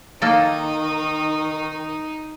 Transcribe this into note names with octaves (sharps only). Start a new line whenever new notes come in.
D#3 A#3 D#4 A4